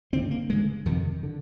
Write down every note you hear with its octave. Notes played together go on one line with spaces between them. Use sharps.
G2 D3 C4
A#3
G2 D3 G#3
F2 C3 D#3
D3